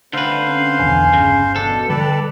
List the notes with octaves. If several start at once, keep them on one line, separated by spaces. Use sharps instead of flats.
D3 A3 C4 B4 C5 D5 F5
C4 C#4
B1 E2 G#5
G1 C#3
E2 B2 D4 A4
D3 G3 B4 D5 G5